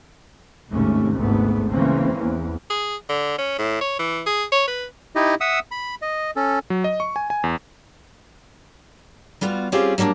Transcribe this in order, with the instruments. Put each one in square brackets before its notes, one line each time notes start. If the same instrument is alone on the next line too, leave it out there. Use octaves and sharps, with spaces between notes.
[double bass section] G#1 D#2 G#2 C3 A3 C#4
G#1 D2 G#2 A3 B3
C#3 E3 A#3 C4 C#4
E2
[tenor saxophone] G#4
D3
C#4
A2
C#5
E3
G#4
C#5
B4
[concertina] D#4 E4 G4 D#5
E5 F#5 D#6 E6
B5
D#5
C#4 A4
[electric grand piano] F#3
D#5
C#6
G#5
G#5
E2
[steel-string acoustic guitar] G3 B3 F4 F#4
G3 C4 C#4 F4 G4 G#4
F#3 G3 A#3 C4 D4